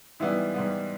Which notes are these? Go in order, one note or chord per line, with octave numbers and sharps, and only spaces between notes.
G#2 E3 G3 B3 E4
G#2 E3 G3 B3